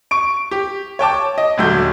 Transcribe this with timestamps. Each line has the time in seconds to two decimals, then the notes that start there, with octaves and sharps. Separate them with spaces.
0.11 C#6 D7
0.51 G4
0.99 C#5 G5 A5 D6
1.38 D#5
1.58 D#1 D2 F#3 G6